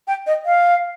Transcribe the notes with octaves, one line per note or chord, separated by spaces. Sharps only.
G5
D#5
F5